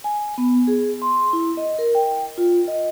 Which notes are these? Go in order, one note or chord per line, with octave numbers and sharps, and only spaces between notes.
G#5
B3
G#4
C6
E4
D#5
A#4
G5
F4
D#5